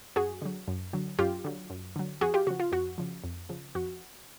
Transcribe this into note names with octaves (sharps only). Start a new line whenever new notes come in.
F#2 F#4 G#4
D3 F#3
F#2
D3 F#3
F#2 F4 G4
D3 F#3
F#2
D3 F#3
F2 F#4 G#4
F4 G4
C#3 F3 F#4
F4
F2 F#4
C#3 F3
F2
C#3 F3
F2 F#4